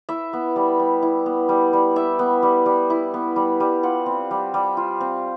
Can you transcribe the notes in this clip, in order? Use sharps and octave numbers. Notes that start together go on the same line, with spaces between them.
E4 E5
B3
G3
G3
E4
B3
G3
G3
E4 E5
B3
G3
G3
E4
B3
G3
G3
F4 F#5
C4
G3
G3
F4
C4